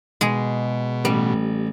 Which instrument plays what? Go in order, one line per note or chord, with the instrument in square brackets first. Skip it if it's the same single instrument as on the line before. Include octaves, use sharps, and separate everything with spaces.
[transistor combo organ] B2 [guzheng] G#3 G#4
[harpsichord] A1 [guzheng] G3